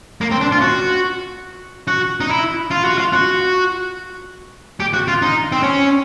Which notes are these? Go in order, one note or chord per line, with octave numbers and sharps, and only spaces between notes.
A#3
C4
D4
F4
F#4
F#4
D#4
E4
F4
F#4
F4
F#4
G4
F#4
F4
D#4
C4
C#4